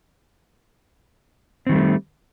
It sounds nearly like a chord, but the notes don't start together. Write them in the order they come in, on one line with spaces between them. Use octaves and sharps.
C4 D#3 G3 A3